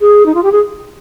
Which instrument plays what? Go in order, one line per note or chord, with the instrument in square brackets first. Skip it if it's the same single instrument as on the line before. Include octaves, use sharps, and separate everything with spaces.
[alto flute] G#4
D#4
F4
G4
G#4